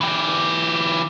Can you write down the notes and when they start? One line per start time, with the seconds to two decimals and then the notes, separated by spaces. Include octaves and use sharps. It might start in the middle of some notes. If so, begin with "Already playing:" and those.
0.01 E3 G4